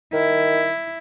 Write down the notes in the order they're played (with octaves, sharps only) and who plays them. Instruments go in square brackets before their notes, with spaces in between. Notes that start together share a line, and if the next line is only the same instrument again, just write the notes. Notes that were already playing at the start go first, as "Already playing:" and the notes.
[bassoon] D#3 [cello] E4